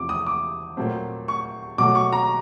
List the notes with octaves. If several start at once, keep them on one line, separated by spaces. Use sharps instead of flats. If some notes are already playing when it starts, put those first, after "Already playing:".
Already playing: E2 C3 F3 D6
D#6
D6
A#2 F#3 A3 C4
C#6
B2 F#3 A3 D6
C#6
A#5